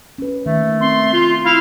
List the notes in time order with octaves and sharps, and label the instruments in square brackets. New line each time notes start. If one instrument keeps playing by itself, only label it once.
[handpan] C#4 B4
[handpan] D#3 [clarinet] A3
[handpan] C4 [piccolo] C6
[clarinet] F4
[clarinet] E4 [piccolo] F5